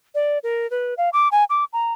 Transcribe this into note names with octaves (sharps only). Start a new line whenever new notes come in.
D5
A#4
B4
F5
D6
G#5
D6
A#5